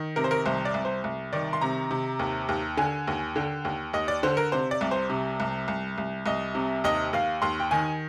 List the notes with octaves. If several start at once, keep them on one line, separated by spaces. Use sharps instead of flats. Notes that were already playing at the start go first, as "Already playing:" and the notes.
Already playing: D#3
C3 A#4
C5
A#4
C2 C5
D5
C2
C5
C2
D#3 D5
C6
C3 A#5
C3
D#2
D#2
D3 G#5
D#2
D3 G5
D#2
D#2 D#5
D5
D3 C5
A#4
C3 C5
D5
C2
C5
C3
C2
C2
C2
C2 D#5
C3
D#2 D#5
D#2 F5
D#2 C6
G5
D#3 G#5